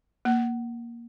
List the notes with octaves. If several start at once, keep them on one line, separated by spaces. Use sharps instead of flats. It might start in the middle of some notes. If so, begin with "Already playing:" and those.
A#3